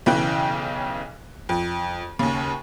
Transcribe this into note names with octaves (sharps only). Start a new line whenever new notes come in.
B1 C#3 E3 G5 F#6
F2
D#2 C#3